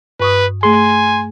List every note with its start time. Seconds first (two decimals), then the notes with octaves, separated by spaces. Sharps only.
0.20 G2 B4 C#6 D#6
0.63 A3 G#4 G#5 C6